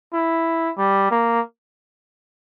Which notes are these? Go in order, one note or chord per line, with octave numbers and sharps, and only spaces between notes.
E4
G3
A#3